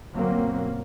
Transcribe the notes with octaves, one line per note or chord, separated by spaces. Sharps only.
G1 B2 F#3 A#3 C4